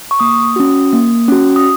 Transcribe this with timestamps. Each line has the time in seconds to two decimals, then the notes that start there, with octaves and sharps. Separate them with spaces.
0.11 C#6
0.20 A#3 D#6
0.56 C#4 F#4
0.93 A#3
1.28 C#4 F#4
1.56 D#6